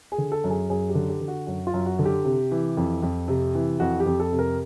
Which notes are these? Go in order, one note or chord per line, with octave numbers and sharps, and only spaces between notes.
G#4
D3
A4
F#2
G#4
F#2 G#4
G4
D3
G4
D3
F#4
F#2 F#4
F4
F#2
F#4
D3
G4
C3
E3
F2
F2
C3
E3
F2 F#4
G4
F2
A4
C3
A#4